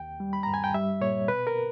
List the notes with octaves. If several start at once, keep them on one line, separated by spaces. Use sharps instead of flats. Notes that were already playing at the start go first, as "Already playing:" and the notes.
Already playing: D#2 G5
G3
B5
G2 A#5
G#5
G5
G3 E5
A#2 C#5
B2 B4
A#4